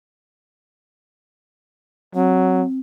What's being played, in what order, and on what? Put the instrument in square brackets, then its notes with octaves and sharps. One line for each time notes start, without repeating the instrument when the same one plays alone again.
[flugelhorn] F#3 [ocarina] C4